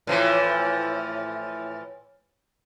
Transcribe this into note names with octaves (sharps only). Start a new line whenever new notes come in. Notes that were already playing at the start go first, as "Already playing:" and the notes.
A2 E3 F3